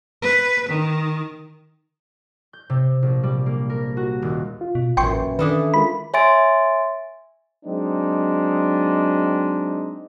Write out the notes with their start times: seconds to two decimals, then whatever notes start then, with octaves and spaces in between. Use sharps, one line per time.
0.22 B4
0.69 D#3
2.53 G6
2.70 C3
3.03 A#1
3.23 G3
3.46 A#3
3.70 A#4
3.97 F#4
4.22 D#1
4.61 F4
4.75 B2
4.97 A1 F#2 E3 G5 C6 C#6
5.11 A#2 B4
5.39 D#3 E3 D4 A4 B4 D#6
5.74 G#3 F4 A#4 B5
6.14 C#5 E5 G#5 C6 A6 D7
7.66 F#3 G#3 C4 D4 D#4